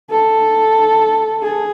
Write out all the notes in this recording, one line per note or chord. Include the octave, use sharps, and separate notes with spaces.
A4
G#4